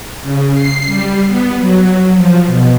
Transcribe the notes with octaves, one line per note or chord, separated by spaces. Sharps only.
C#3
C7
G3
B3
F#3
F3
B2